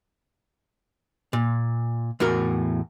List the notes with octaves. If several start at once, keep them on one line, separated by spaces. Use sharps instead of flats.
A#2
E2 A2 F#4 A#4